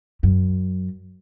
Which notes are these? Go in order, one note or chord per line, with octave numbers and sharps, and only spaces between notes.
F#2